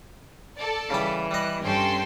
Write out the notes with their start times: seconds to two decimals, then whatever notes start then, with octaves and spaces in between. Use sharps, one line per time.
0.57 A4 D5
0.90 C#3 E3 G3 G5
1.31 G3 D#5 F#6
1.64 G2 C#4 A4 G5 C6